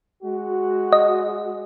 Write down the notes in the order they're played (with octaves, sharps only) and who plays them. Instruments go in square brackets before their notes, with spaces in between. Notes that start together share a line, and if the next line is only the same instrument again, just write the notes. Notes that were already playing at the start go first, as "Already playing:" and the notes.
[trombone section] G#3 F#4
[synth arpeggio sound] D#5